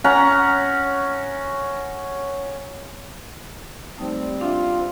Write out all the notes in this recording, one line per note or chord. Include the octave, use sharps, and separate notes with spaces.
C#4 F#5 A#5
F3 G3 A3 C4 D#4
D4 F4 E5